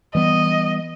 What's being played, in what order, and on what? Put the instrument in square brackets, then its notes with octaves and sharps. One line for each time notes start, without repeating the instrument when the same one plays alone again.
[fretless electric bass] E3 G3 B3 [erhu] D#5